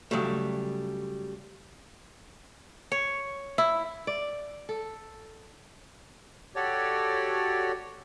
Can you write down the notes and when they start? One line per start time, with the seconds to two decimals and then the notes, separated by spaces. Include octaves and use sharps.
0.11 C#3 F#3 G3 A3
2.92 C#5
3.58 E4
4.07 D5
4.69 A4
6.55 F#4 G4 A4 C#5 D5